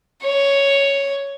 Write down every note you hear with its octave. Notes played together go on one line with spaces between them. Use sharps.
C#5